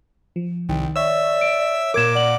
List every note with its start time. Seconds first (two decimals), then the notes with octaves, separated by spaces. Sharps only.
0.36 F3
0.69 C2 D#3 G5
0.96 C#5 D5 E5 E6
1.41 D7
1.94 A#2 A#4 D6 G#6 E7
2.15 D5 F#5 F#7